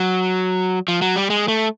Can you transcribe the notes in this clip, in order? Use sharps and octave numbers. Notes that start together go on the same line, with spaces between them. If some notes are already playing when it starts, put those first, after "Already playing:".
Already playing: F#3
F3
F#3
G3
G#3
A3